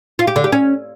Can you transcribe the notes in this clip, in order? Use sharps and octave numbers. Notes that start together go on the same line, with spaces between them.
F4
G4
D3
G4
C#4